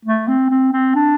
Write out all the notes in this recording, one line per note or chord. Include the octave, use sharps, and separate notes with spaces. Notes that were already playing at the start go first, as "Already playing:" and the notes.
A3
C4
C4
C4
D4